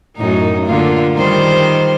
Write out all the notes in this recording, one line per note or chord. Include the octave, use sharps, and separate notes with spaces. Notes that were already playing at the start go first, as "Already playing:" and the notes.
F#2 A2 D#4
D3 A#3 F4
D#3 G3 C5